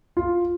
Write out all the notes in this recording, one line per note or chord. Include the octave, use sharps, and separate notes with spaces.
F4